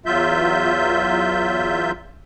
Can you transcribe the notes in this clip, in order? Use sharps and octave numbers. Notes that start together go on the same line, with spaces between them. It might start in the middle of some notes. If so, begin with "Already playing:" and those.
E2 F#3 F4 E5 G6